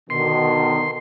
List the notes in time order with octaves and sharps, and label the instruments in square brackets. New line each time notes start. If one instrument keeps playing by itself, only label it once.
[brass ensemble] B2 D3 D#3 [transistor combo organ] C6